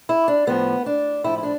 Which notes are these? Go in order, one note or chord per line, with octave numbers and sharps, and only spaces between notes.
E4
D4
A2 F3 B3
D4
A2 F3 E4
E4
D4